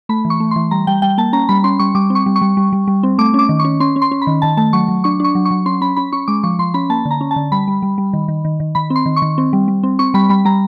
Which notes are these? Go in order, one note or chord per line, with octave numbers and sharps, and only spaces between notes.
A3 B5
E3
C#6
A3
E3 C6
G3 A#5
G3 G5
G3 G5
A#3 A5
C#4 A#5
G3 B5
C#4 C6
G3 C#6
G3 D6
C4
C#6
G3
C#6
G3
G3
G3
G3
C4
A3 D6
C#4 D6
D#3
C#6
C#4
C#4 C6
C#4
C6
C#4
B5
D#3
D#3 A5
A3 A5
F#3 C#6
F#3
D4 C#6
D4 C#6
F#3
C#6
F#3
C#4 C6
C#4 B5
C#4 B5
C#4 C#6
G#3 D6
F3 C#6
F3 C6
C#4 B5
A#3 A5
D3
A#5
C#4
A5
D3
G3 B5
G3
G3
G3
D#3
D#3
D#3
D#3
D#3 B5
C4
C6
D#3
C#6
D#3
C4
G3
G3
C4
C4 C#6
G3 B5
G3 B5
G3 A#5